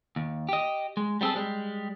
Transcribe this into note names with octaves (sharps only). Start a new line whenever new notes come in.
D#2
G4 D#5
G#3
G3 B3 C4 G#4 A4
G3 G#3